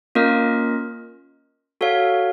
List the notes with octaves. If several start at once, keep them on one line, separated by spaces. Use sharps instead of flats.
A#3 C#4 F4 A#4 D#5
F#4 A4 C#5 F5